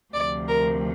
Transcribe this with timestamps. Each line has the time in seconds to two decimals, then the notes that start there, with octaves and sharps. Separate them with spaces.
0.13 D2 C3 F3 D5
0.48 A#4